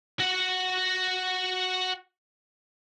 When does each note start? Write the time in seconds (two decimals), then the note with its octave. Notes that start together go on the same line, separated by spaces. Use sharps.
0.20 F#4 F#5